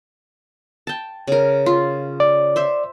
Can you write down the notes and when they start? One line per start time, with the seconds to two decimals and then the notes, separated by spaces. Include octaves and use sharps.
0.87 G5 A5
1.27 C#3 A#4
1.66 F4
2.20 D5
2.56 C5 E5